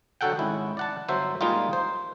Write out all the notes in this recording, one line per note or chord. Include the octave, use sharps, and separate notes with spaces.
D3 F#3 F#4 A4 F#5 G5
G#1 G#3 C#4 E4
D5 F#5 A5
G1 F#3 C5 E5
A#2 G3 G#3 D#4 F4
C5